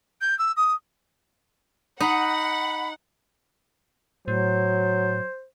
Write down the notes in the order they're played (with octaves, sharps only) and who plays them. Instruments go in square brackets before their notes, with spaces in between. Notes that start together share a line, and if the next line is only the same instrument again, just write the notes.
[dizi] G6
E6
D#6
[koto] D#4 [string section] F#5 [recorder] B5
[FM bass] A2 [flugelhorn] F#3 [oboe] C5